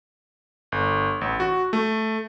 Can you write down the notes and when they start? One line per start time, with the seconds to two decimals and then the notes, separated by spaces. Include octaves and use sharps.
0.72 G1
1.21 A1
1.40 F#4
1.73 A3